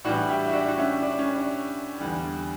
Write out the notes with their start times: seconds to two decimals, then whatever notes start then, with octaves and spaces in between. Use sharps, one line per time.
0.04 A2 E3 G3 D4 F#4
0.29 E4 G4
0.47 E4
0.53 D4 F#4
0.68 F#4
0.78 C#4 E4
1.02 D4
1.19 C#4
1.35 D4
2.00 E2 D3 G3